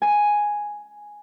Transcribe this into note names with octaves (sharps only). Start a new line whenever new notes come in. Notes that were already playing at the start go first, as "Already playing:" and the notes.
G#5